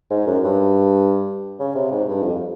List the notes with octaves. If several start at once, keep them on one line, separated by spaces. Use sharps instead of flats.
G#2
F#2
G2
C#3
C3
G#2
G2
F2